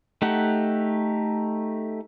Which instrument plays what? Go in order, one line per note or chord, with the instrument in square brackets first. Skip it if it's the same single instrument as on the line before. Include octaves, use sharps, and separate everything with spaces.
[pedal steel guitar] A3 D#4 G4 F#5